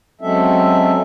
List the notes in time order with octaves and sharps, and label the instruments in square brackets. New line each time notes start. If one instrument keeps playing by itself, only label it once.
[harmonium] F#3 G#3 C4 C#4 A4 E5